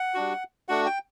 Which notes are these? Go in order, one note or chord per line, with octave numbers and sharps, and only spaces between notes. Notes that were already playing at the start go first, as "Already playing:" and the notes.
Already playing: F#5
G3 D4 F#4
A3 D4 F#4 F#5
G5